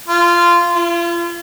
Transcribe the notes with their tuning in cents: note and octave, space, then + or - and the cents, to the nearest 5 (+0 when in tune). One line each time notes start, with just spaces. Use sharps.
F4 -15
F4 -40